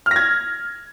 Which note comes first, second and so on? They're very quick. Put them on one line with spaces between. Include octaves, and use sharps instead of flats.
F6 A#6 G#6